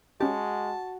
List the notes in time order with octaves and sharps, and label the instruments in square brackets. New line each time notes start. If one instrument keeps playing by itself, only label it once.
[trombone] G#3 [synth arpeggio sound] C#4 G4 [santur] F#4 C#6 [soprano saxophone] A5